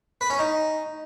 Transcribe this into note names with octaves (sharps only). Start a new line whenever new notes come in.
B4
C#4
D#4